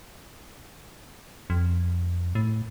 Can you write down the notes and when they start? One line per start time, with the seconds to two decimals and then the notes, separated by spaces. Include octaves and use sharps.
1.50 F2
2.35 A2